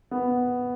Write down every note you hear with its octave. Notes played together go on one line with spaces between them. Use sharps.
B3